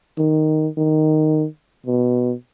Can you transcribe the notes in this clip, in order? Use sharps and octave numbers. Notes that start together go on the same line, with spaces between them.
D#3
D#3
B2